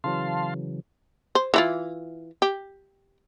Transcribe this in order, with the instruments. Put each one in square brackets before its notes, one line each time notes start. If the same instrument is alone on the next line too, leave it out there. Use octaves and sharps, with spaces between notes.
[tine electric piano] C#3 E3 F#3 [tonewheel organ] F5 A5 C6
[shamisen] C5
E3 E4 F4
G4